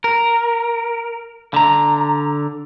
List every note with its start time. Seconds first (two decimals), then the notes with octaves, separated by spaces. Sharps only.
0.04 A#4
1.54 D3 A#5